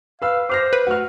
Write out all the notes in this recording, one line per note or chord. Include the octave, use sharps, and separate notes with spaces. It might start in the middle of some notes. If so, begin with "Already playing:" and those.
B4 F5 E6
C5 D6 F6 A#6
B4
A3 F#4 F6